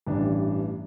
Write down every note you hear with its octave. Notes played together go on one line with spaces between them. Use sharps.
A1 G2 E3 G3 D4